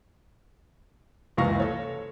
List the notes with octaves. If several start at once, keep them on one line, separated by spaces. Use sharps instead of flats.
F#1 C#2 E3 F5 C#6 A#6
A4 C#5